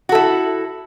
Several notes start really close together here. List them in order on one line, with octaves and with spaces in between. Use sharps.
F#4 A4 E4